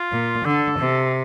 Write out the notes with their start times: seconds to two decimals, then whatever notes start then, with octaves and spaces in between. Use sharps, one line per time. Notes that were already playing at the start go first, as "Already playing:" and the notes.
Already playing: F4
0.12 A#2
0.44 D3 A4
0.79 C3